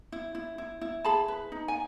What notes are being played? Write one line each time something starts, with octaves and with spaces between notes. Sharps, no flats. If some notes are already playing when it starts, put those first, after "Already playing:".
E4
E4
E4
E4
G#4 A5 B5
B4
D#4
G#5